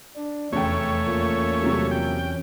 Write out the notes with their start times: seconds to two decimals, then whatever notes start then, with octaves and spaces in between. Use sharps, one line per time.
0.16 D4
0.53 F1 E2 C#3 A3 C#4 C#5 G5
1.07 A#2
1.62 C3 F#3 G3
1.91 G5